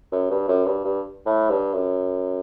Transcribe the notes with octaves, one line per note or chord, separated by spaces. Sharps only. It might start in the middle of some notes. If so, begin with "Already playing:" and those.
F#2
G2
F#2
G2
G2
A2
G2
F#2